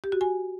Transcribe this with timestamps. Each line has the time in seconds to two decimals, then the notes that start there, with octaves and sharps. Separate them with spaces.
0.04 G4
0.12 F#4
0.21 G#5